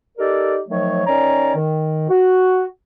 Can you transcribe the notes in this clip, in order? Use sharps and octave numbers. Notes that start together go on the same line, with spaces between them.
D#4 G4 A4 A#4 D5
D#3 F3 F#3 A3 C#5
D#3 C#4 C#5 D5 A#5
D#3
F#4